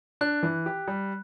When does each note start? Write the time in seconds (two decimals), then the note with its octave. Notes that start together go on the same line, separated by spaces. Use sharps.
0.21 D4 F#6
0.43 E3
0.66 G4
0.88 G3